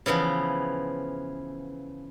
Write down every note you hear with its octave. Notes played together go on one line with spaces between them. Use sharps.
C#3 E3 F3 B3